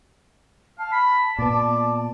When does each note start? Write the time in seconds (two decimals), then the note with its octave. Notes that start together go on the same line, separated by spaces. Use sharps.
0.79 F5 A5
0.92 B5
1.39 A#2 B3 D5